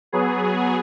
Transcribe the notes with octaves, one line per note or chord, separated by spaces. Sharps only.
F#3 B3 G#4